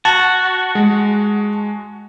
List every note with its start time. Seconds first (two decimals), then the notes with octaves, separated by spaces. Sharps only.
0.05 F#4 A5
0.75 G#3